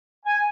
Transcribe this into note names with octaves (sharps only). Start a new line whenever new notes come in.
G#5